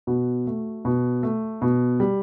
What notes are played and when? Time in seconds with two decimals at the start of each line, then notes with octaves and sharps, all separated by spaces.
0.07 B2 F#4
0.47 A3
0.85 B2
1.23 A3
1.62 B2
2.00 G3